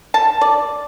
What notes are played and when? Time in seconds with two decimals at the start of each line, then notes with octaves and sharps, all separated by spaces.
0.14 A5
0.41 D5